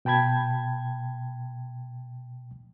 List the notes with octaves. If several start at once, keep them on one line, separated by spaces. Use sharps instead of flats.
B2 G5 A5 B5 G#6